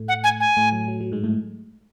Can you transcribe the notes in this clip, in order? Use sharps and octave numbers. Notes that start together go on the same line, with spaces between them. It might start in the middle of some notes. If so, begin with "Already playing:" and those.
Already playing: A2 A3
F#5
G#5
G#5
A2 A3
F#3
F#3
F#3
G#2 G#3
A2 A3